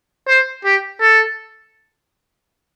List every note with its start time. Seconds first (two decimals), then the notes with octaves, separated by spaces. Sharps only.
0.28 C5
0.65 G4
1.01 A4